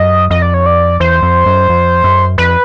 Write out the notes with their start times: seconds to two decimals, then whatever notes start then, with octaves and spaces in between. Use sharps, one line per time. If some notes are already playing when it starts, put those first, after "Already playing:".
Already playing: F#2 D#5
0.30 F2 D#5
0.42 D5
0.54 C#5
0.66 D5
1.00 E2 C5
1.22 F2
1.46 F#2
1.69 F2
2.04 F#2
2.38 F2 B4